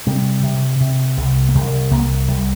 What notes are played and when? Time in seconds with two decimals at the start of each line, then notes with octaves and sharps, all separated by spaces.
0.07 C3 G3
0.43 C3
0.81 C3
1.17 C2
1.49 A#3
1.54 C2 G3
1.91 C2 A#3
2.28 C2 G3